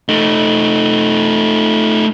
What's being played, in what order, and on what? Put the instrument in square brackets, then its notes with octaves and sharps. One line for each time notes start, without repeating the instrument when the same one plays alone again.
[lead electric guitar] A3 D#4